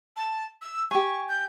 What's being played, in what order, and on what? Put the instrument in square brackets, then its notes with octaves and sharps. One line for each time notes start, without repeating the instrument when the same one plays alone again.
[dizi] A5
E6
[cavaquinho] G4 G#5 [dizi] C#6
[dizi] G6